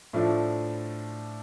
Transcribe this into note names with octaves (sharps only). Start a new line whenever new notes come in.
A2 F3 A3 D4